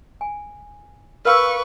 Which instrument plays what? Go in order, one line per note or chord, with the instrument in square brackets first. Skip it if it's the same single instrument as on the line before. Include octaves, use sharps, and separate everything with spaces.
[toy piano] G#5
[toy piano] A#4 F5 B5 [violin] B4 C#6 [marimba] E6 F6